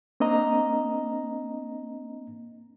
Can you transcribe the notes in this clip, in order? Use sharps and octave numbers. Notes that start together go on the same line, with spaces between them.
A#3 C4 D4 D#5 A#5